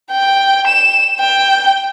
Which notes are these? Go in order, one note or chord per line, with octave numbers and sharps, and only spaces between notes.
G5
E7
G5